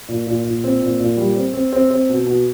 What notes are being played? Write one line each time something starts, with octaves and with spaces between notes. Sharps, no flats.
A#2
A#2
A#2
C4
A#2
A#2
G3
C4
C4
C4
C4
B2
B2